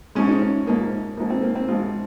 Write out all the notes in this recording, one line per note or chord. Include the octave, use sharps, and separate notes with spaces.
G#2 F3 G#3 C#4
D#4
C#4
G#2 F3 G#3 A#3
G#2 F3 G#3 A#3
C4
A#3
C4
G#2 F3 G#3 F4